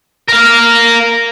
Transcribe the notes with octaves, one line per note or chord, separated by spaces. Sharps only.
A#4 F5